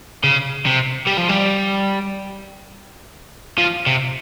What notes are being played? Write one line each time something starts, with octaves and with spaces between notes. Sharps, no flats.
C#3
C3
G3
F3
G3
F3
C3